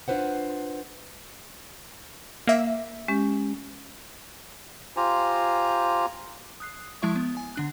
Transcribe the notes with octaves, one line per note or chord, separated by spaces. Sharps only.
D4 F4 B4 C5 F#5
A#3 E5
G#3 C#4 G4
F4 G4 C5 G#5 A#5
D#6 F#6 C7
F3 G#3 E4 E5 C#6
B3
G#5
D3 D4 F#6